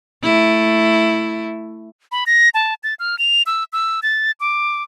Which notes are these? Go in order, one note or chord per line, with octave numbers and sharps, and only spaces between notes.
A3 E4
B5
A#6
A5
A6
F6
F7
E6
E6
A6
D6